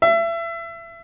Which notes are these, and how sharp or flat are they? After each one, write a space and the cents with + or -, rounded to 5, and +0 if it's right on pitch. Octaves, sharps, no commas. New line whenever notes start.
E5 +30